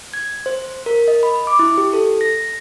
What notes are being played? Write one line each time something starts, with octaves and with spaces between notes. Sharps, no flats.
G#6
C5
A#4
D#5
B5
D6
E4
G4
A4
A#6